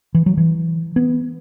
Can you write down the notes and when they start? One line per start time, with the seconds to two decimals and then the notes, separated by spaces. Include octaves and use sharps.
0.14 E3
0.26 F#3
0.37 E3
0.96 B3